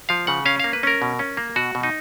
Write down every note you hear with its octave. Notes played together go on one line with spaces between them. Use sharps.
F3 F5
C#3 F#5
C#4 F5
A#3 F5
B4
C#4 A#4
B2
C#4
A#3
B2 F#4
B2
D#4